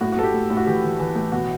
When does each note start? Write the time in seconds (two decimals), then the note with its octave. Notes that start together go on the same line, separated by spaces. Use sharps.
0.01 A2 F#4
0.12 F#4
0.17 A2 A4
0.23 G4
0.34 A2
0.50 A2
0.57 F#4
0.66 E3 G4
0.83 E3
0.99 E3
1.16 A2
1.32 B2 F#4